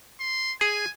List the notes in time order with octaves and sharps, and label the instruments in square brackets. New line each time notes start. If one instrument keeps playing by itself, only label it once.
[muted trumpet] C6
[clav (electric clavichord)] G#4 [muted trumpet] G#5